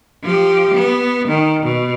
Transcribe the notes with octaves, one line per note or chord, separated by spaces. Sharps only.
F3 G4
B3
D#3
B2